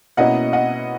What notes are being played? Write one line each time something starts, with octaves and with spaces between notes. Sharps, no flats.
B2 A#3 C#4 E4 D#5 F#5
D#5 F#5